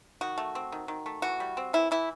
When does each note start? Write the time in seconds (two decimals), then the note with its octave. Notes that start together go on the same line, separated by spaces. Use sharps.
0.21 D#3 F#4
0.38 A3
0.55 C4
0.72 D#3
0.88 D#3
1.06 A3
1.22 E3 F#4
1.40 G3
1.57 C4
1.73 E3 E4
1.91 E3 E4